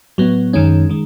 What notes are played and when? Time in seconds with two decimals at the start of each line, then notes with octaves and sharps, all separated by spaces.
0.18 A2 F#3 B3
0.53 F#2 D#3 G#3 C#4
0.89 D#3 G#3